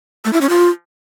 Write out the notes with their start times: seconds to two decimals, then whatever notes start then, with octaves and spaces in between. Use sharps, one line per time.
0.25 A3
0.33 E4
0.41 C#4
0.49 F4